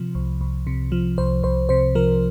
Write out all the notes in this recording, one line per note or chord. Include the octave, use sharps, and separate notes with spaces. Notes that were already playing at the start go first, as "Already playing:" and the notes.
Already playing: C3 F3
C2
C2
C3
F3
C2 C5
C2 C5
C3 C5
F3 A#4